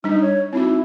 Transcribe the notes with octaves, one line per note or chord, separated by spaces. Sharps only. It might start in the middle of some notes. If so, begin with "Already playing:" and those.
G3 D4 D#4
C#5
C4 D#4 E4 F#4